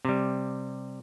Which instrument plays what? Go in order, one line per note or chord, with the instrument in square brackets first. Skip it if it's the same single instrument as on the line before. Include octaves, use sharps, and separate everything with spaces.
[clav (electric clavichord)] C3 G3